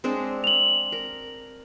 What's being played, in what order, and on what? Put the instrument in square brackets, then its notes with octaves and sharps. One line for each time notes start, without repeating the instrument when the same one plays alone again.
[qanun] G#3 C4 D4
[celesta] F7 F#7
[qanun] A#4